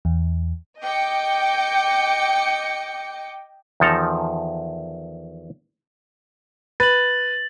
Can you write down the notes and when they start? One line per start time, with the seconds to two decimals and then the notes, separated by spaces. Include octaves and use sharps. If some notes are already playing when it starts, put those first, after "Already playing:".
0.05 E2
0.84 D#5 G5 D6 G6 C#7
3.80 E2 D#3 F3 A4 A5 A#5
6.80 B4 A6 F#7